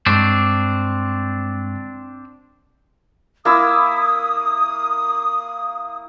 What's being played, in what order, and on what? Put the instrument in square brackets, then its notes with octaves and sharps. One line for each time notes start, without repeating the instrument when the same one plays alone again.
[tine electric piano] G2 G#3 C#6 [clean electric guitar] C4 D4
[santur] A#3 E4 E6 [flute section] D#6